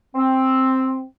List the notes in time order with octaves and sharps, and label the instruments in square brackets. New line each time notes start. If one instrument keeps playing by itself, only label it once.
[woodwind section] C4